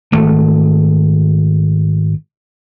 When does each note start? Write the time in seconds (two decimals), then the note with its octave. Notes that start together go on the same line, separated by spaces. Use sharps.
0.12 G#1 A3